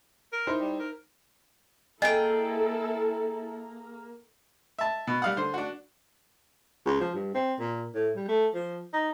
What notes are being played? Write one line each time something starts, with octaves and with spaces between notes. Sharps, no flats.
A#4
D#4 E4 C5
G3
A#4
A#3 E4 G#4 A4 D#5 G5
E5 A5
B2
G3 F5 F#5
D3 C5
D4 F#4
C#2
F3
G2
C4
A#2
A2
G3
A3
F3
D#4